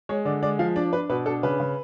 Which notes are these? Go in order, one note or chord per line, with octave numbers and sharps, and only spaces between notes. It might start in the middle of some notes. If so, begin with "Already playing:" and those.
G#3 C#5
D3 D5
G#3 D5
F3 F5
D4 D5
D4 B4
B2 B4
D4 A4
C#3 B4
C#3